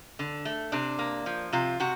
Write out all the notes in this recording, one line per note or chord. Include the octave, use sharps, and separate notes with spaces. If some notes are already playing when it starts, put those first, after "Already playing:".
D3
A3
C3 D4
A#3
F3
C3 F4
C3 F#4